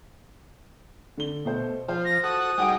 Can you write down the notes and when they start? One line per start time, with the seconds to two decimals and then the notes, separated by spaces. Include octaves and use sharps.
1.18 D3 G7
1.45 B2 A3 C5
1.88 F3 C5
2.05 A#6
2.23 F#4 A4 D#6
2.58 G3 G#3 D#4 F#4 F#5 D7